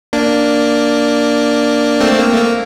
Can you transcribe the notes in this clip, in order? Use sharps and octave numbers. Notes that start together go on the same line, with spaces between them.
A#3 D4
A3 C4
A3
A#3
A3
A#3